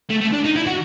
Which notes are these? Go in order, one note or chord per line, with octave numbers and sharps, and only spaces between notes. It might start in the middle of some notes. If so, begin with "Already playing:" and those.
A3
A3
D4
D#4
E4
F#4